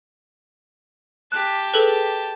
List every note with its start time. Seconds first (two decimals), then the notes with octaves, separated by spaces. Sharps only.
1.32 G4 A5 F#6
1.74 G#4 A4 B4